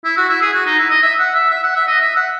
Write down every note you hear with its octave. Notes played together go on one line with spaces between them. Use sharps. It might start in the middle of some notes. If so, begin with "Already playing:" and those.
E4
F#4
E4
G#4
F#4
D#4
E4
D#5
E5
F#5
E5
E5
F#5
E5
D#5
E5
F#5